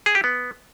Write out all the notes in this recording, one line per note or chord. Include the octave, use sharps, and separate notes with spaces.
G#4
G4
B3